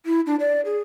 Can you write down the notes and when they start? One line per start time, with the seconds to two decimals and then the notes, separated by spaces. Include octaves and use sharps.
0.06 E4
0.26 D4
0.40 D5
0.65 G#4